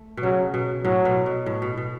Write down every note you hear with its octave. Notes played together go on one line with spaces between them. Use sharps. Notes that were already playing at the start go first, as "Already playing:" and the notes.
Already playing: A3
B2
C#3 F#3
B2
A2 F#3
B2
B2
A2
B2
B2